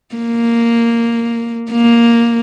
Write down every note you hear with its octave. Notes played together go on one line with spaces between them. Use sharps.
A#3
A#3